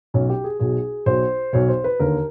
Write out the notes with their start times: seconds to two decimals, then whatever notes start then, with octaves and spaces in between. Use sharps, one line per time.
0.14 B1 B2 C#4
0.30 G4
0.44 G#4
0.60 B1 B2 G#4
1.06 B1 B2 C5
1.53 B1 B2 C#5
1.69 C5
1.84 B4
2.00 D#2 D3 A#4